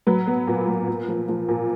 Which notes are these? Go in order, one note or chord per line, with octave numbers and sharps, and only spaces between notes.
F#3 B4
B3
A#2
F#3
A#2
F3
F3
A#2